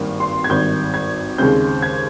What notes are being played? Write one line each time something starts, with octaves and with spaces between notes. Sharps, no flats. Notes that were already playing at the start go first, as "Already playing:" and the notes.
Already playing: G#1 G2 D#3 A#3
C6
G#6
G#1 G2 D#3 G6
G#6
D#2 C#3 G#3 C4 G6
G#6